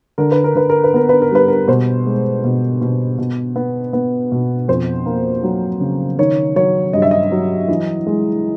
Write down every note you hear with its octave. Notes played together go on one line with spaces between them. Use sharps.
D3 A#4
B4
A#4
D3 B4
A#4
B4
B3 A#4
B4
A#4
G3 B4
A#4
B2 C5
G#3
B2
B2
B2
B3
B3
B2
F2 C5
A#3
F#3
C#3
D#3 C#5
F#3 C#5
G2 D#5
E5
D#5
F#3
E3
G#3